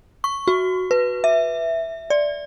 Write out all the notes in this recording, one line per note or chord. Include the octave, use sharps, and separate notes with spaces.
C#6
F#4
B4
E5
D5